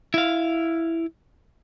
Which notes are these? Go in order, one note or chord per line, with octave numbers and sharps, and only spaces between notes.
E4 F5